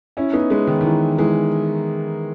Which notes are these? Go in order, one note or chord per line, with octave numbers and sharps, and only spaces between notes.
C#4 E4
B3 D#4
G#3 B3
D#3
D#3
E3
E3 G#3